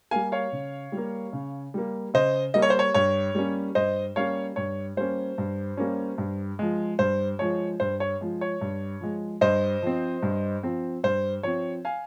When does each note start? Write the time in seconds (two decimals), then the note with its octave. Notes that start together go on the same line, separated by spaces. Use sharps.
0.11 G3 A#3 F5 G#5
0.32 C#5 F5
0.52 C#3
0.92 G3
0.97 A#3
1.33 C#3
1.74 G3 A#3
2.14 C#3 C5 D#5
2.54 G3 A#3 D#5
2.62 C#5
2.70 C5
2.79 C#5
2.94 G2 C#5
3.35 G3 A#3 C#4
3.75 G2 C5 D#5
4.16 G3 A#3 C#4 C#5 F5
4.56 G2 C#5
4.97 G3 A#3 C#4 C5
5.38 G2
5.77 G3 A#3 C#4
6.18 G2
6.59 F3 G#3
6.99 G2 C5
7.39 F3 G#3 C#5
7.80 G2 C5
8.00 C#5
8.21 F3 G#3
8.41 C#5
8.61 G2
9.01 F3 G#3
9.41 G2 C5 D#5
9.83 F3 C4
10.23 G2
10.63 F3 C4
11.04 G2 C5
11.43 F3 C4 C#5
11.85 F5 G#5